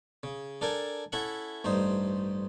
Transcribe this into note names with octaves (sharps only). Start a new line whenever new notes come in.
C#3
D4 A4 A#4 G5 G#5
C#4 E4 A4 E5 F#5
A1 G2 D#4 C5